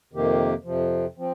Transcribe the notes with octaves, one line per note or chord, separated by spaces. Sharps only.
F2 C3 D#3 A#3 G4
F2 C3 F3
F3 C4